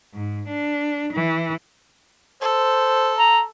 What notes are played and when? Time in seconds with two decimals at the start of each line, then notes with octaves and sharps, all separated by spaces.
0.14 G#2
0.48 D4
1.12 E3
2.42 A4 C5
3.18 A#5